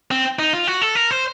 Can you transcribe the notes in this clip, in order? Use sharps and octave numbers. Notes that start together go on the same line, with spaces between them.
C4
D#4
F4
F#4
A4
A#4
C5